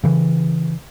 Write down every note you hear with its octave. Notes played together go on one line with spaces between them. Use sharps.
C#3 E3